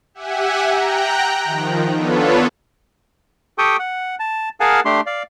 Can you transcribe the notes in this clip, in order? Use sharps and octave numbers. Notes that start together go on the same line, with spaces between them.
G4 E5 F#5 G#5
G5 A#5 F#6
D#3 F3
B3 D4 F4 A4 B4 C#5
G4 A4 G5 C#6 D#6
F#5
A5
G#4 A#4 F5 F#5 G#5 A5
A3 D4 G4 C6
D5 F5